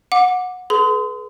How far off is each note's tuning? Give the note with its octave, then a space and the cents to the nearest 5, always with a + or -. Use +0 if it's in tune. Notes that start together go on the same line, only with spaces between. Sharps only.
F#5 -20 D6 +0
G#4 +35 B4 -15 C6 -35